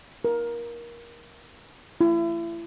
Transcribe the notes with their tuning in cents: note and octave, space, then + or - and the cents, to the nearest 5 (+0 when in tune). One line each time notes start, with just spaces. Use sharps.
A#4 +20
E4 +35